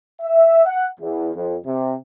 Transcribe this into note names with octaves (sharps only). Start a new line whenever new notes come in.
E5
F#5
E2
F2
C3